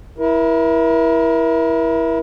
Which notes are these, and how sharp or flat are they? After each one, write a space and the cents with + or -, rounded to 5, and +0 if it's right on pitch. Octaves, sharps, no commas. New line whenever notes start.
E4 +0 A#4 +35